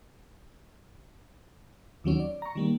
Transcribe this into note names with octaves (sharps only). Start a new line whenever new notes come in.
D#2 D#3 F#3 C#4
D5
A#5 C#6
D#3 G3 A#3